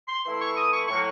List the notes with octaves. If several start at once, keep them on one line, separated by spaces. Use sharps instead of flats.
C6
E3 A3 C4 E4 C6
C#6
D#6
C#6
A2 F#3 A#3 C#6